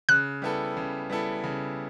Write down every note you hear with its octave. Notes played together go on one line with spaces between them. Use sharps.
C#3 F#6
G3 B3 E4 A4
C#3
G3 B3 E4 A4
C#3